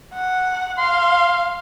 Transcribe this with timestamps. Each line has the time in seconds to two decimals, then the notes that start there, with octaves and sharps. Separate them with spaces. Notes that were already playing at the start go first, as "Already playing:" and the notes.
0.14 F#5
0.78 F5 C6